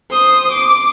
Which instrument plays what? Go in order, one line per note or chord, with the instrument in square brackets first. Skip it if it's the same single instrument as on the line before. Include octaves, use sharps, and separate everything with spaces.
[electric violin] C5 D#6
D6